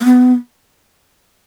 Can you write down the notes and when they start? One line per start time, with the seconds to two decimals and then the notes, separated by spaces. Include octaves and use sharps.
0.01 A#3
0.05 B3